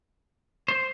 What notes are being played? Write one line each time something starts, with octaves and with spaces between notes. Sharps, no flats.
C5